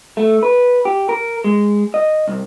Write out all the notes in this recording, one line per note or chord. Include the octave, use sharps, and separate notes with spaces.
A3
B4
G4
A#4
G#3
D#5
C2